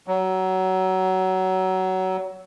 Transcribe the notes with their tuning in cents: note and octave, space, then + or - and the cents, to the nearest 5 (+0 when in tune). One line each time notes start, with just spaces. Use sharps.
F#3 +20